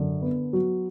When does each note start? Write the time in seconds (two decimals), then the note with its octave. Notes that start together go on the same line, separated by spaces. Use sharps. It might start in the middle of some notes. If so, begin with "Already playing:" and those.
Already playing: F#2 D3
0.22 B3
0.53 F#3